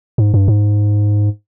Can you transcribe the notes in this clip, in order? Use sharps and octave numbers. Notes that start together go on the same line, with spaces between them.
G#2
G2
G#2